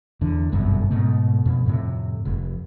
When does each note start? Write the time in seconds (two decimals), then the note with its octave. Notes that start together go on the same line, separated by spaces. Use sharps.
0.21 E2 D3
0.52 G1 C2 F#2 B2
0.91 G#2 B2 A3
1.46 F2 B2
1.66 F2 A2 C3
2.25 F1